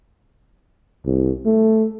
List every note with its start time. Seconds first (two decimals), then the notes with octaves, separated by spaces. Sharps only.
1.06 C2
1.46 A3